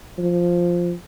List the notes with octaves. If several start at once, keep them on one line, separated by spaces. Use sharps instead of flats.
F3